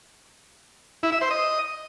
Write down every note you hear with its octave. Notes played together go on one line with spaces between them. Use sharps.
E4
E5
C5
D#5